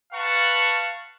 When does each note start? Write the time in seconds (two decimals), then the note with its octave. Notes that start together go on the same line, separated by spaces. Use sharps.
0.12 B4 F5 F#5 A5 C#6